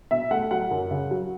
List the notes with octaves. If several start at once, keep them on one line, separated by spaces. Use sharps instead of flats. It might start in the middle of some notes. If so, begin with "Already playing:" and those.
B2 E5
A3 F#5
F#3 F#5
F#2
C#3
F#3